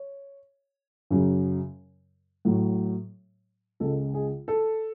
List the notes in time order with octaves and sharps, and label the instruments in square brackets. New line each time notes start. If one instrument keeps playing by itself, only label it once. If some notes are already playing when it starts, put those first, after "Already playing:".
Already playing: [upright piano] C#5
F#2 C#3 F#3
A2 F#3
C#2 C#3 G#3 A4
G#4
A4